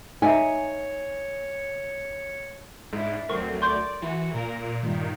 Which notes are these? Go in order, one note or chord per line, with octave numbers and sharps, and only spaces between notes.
D#4 C#5 D#5 E5 G#5
G#2 D4 E4
D2 D3 F#3 C4 A#4 C#6
D5 C6 C#6 G6
E3 F#4
A#2 A#4
G2 A#2 D#3